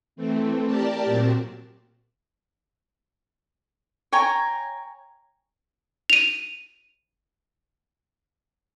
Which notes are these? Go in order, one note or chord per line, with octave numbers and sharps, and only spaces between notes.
E3 A3 C4
G4 A#4 D5 A5
A#2 F#3 C4
C#5 G5 G#5 A#5
D#7 F7